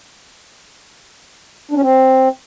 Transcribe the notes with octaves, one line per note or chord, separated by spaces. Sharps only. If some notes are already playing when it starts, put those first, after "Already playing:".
D4
C#4
C4